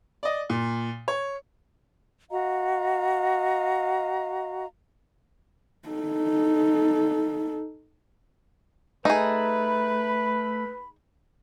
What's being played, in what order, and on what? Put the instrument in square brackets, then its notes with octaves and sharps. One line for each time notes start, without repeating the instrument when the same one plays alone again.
[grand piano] D5 D#5
A#2
C#5
[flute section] F#4 D#5 F5 A#5
[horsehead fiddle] D#4 A4
[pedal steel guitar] A3 [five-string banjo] D#4 G#4 [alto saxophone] B4 [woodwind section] B5